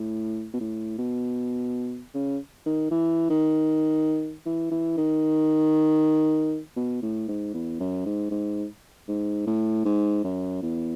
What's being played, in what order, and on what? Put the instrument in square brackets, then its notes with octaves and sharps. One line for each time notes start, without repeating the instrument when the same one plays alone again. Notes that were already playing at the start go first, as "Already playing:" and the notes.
Already playing: [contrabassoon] A2
B2
A2
B2
C#3
D#3
E3
D#3
E3
E3
D#3
B2
A2
G#2
E2
F#2
G#2
G#2
G#2
A2
G#2
F#2
E2